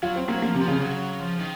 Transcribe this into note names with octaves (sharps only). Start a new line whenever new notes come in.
F#3 F4
C4
F#3 A#3
F3 A#3
C3
F3
C#3
F#3
F3
D#3